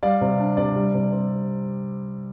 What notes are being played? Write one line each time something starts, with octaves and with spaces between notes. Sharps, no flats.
G3 D5 F5
C3
D4
C3 D5
G3
C3
C4